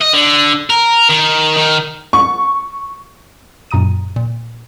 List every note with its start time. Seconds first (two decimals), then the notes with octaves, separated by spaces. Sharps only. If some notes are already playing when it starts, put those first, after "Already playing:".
0.01 D#5
0.13 D3
0.70 A#4
1.09 D#3
1.57 D#3
2.13 C#6
3.71 F#2 A#2 A#5 D#6 D#7
4.16 A#2